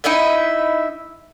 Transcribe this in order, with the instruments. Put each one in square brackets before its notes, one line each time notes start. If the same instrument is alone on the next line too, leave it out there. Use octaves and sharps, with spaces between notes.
[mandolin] D#4 E4 D#5 E5